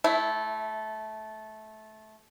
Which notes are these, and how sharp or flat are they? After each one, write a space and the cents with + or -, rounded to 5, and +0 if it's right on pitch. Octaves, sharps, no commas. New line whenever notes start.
A3 -15 E4 +5